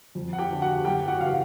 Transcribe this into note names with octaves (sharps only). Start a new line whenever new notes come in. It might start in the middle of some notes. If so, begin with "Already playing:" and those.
F2
F#5
G4 G5
D3
F#4 F#5
F#2 G4 G5
F#4 F#5
C#3 E3 F5